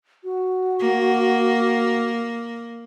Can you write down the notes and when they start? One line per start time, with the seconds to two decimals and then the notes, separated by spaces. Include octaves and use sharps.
0.24 F#4
0.80 A#3